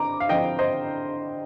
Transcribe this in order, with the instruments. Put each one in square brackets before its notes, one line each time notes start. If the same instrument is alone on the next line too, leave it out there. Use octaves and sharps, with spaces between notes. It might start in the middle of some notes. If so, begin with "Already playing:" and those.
Already playing: [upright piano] D3 C4 A#5 D6
F5
D3 F3 C4 D#5 G5
C5 D#5